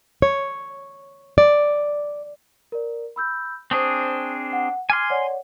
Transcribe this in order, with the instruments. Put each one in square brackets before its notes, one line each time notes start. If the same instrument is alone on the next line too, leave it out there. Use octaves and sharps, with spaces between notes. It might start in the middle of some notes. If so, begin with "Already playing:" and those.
[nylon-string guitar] C#5
D5
[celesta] A#4 D5
B5 E6 G6
[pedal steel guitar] C4 D4 G#4 [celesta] C5 C#6 D#6
[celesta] F#5
[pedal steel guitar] G#5 C6 [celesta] D6 F6 G#6
[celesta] C#5 D5 F#5